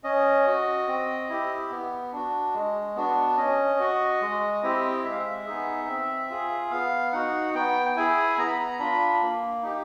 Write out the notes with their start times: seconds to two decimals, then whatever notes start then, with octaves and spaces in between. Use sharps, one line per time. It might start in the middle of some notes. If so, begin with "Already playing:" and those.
0.04 C#4 D#5
0.47 F#4
0.88 C4
1.29 E4 G4
1.70 B3
2.13 D4 F#4
2.54 G#3
2.96 B3 D4 F#4
3.37 C#4 D#5
3.80 F#4
4.21 G#3
4.63 C4 E4 G4
5.04 G#3 E5
5.11 F5
5.19 E5
5.46 B3 D#4 G#4
5.88 C4
6.30 F4 G#4
6.71 B3 F5
7.12 D#4 F#4 F#5
7.54 B3 G5
7.86 G5
7.96 E4 G#4 G#5
8.38 B3 A#5
8.47 B5
8.57 A#5
8.79 D4 F4 B5
9.22 A#3
9.63 D#4 G4